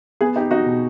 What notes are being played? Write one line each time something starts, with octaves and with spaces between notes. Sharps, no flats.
B3 G#4
D#4 G4
D#4 F#4
B2